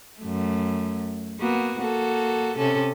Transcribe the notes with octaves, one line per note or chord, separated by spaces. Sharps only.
F#2 A3
A#3 B3 F#4
A#3 F#4 A4
C3 C#4 A4